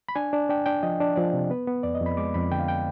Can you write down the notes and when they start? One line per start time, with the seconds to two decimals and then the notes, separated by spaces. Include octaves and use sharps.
0.09 B5
0.15 D4 G#5
0.33 D4
0.49 D4 G5
0.66 D4 G5
0.83 F3 D#5
1.00 D4
1.16 F3 D5
1.34 C3
1.50 B3 B4
1.67 B3
1.83 F2 D5
1.95 D#5
2.01 F2
2.06 B5
2.17 G#3 D6
2.34 F2 B5
2.51 D3 G5
2.60 F5
2.68 G5